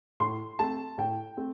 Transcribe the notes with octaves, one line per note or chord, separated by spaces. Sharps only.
A2 C6
A3 C4 A5
A2 G5
A3 C4